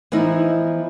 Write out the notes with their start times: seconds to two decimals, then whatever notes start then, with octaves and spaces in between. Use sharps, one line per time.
0.12 E3 F3 B3 D#4 E4